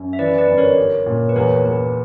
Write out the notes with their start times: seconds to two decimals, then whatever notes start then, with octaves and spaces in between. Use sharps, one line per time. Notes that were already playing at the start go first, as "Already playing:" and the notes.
Already playing: F#2 C#4
0.13 E5
0.19 E3 B4 D5
0.38 B4 D5
0.48 G1
0.57 A#4 C#5
0.78 G4
1.06 A#2
1.29 B4
1.36 E2 A#4 C#5
1.65 E2 B4